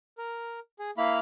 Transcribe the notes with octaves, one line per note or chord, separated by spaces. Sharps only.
A#4
G#4
A#3 E4 F5 B5 F6